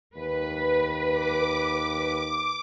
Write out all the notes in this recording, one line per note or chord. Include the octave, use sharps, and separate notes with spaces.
D#2 B4
D6